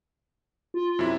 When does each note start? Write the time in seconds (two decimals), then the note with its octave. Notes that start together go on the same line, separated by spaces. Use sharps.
0.74 F4
0.99 F#2 C3 E4